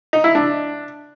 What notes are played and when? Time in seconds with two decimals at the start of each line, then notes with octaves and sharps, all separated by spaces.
0.13 D#4
0.24 E4
0.35 D4